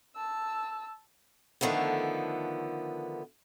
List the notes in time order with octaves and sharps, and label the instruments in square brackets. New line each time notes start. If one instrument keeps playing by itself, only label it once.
[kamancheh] A5 E6
[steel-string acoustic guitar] D3 D#3 F3 A3 B3